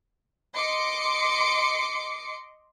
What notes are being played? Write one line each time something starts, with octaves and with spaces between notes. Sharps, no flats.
D#5 C6 D6 C#7